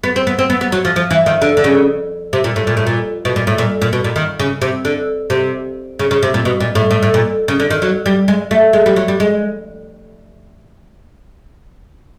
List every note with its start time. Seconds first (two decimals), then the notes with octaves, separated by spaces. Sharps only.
0.04 B3
0.16 C4
0.27 B3
0.39 C4
0.50 B3
0.61 B3
0.72 F#3
0.85 F3
0.96 F3
1.11 E3
1.26 D#3
1.42 D3
1.57 D3
1.64 C#3
2.33 C3
2.44 A#2
2.56 A2
2.67 A#2
2.77 A2
2.87 A#2
3.25 B2
3.36 A#2
3.47 A2
3.58 A#2
3.82 A#2
3.93 B2
4.04 A#2
4.16 D#3
4.40 C#3
4.62 C3
4.85 D3
5.30 C3
5.99 C#3
6.11 C#3
6.23 C3
6.34 A#2
6.45 B2
6.60 A#2
6.75 A2
6.91 A2
7.03 A2
7.14 A#2
7.48 C#3
7.60 D3
7.70 D#3
7.82 F#3
8.06 G3
8.28 G#3
8.51 A3
8.73 G#3
8.86 G3
8.96 F#3
9.08 G3
9.20 G#3